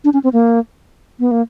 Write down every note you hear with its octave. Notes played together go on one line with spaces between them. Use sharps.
D4
C#4
C4
A#3
B3
A#3